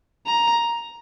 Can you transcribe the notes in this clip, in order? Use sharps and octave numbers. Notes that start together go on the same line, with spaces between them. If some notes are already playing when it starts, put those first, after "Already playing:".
A#5